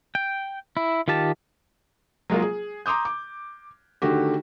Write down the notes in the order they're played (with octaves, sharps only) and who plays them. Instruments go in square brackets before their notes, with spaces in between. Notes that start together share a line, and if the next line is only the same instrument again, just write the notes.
[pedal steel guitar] G5
E4
D#3 F4 G4 A5
[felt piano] F#3 G#3 A#3 F4
G#4
A#5 C6 D6 D#6 G6
D6
D3 D#3 A3 F#4 G4